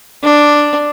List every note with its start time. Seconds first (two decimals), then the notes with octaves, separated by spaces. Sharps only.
0.24 D4